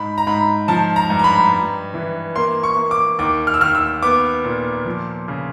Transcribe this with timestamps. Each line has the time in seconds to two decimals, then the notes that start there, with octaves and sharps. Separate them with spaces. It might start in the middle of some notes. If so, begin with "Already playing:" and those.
Already playing: G#2 B5
0.18 A#5
0.27 G#2 B5
0.68 F3 A5
0.96 A#5
1.10 G2
1.19 A#5
1.24 B5
1.52 G2
1.94 E3
2.36 A#3 C6
2.63 C#6
2.77 A#3
2.91 D6
3.19 D#2 D6
3.47 F6
3.54 E6
3.61 D#2 F6
3.75 E6
4.02 B3 D6
4.45 A#2
4.86 F3
5.28 C#3